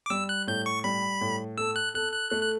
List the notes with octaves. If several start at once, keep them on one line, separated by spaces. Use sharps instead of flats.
D6
G3 E6
F#6
A2 G6
C#6
G3 B5
A2
A4 E6
F#6
A4 F#6
F#6
A3 F#6
F#6